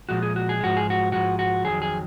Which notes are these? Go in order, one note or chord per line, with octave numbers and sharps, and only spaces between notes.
A#2 F3 G#3 F#4
G#4
F#4
G#4
G#2 F3 G#3 F#4
G#4
F#4
G#2 F3 G#3 F#4
F#4
F2 D#3 F#3 G#4
G#4